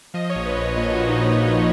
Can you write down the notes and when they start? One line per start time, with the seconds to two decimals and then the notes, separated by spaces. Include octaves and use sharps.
0.14 F3 D#5
0.30 C#5
0.35 A#1
0.46 B4
0.56 A#1 C#5
0.77 A#2 D#5
0.92 F#4
0.97 F3
1.08 D#4